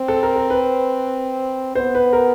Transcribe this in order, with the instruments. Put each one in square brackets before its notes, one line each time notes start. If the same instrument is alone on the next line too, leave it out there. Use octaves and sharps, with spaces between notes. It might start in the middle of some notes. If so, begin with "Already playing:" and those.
Already playing: [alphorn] C4
[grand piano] A4
A#4
A#4
B4
[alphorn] B3 [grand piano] C5
[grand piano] B4
A#4